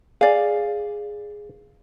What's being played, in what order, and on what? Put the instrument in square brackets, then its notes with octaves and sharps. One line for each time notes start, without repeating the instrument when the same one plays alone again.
[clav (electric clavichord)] G#4 [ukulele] D5 F5